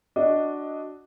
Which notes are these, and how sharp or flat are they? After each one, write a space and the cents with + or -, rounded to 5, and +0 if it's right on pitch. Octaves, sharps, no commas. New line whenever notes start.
D4 +0 F#4 +0 D#5 +15